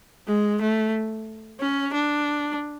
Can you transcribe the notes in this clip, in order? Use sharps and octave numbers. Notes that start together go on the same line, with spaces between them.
G#3
A3
C#4
D4